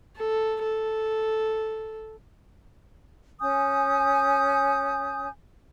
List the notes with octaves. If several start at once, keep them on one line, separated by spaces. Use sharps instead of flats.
A4
A4
C#4 G#5 D#6 G6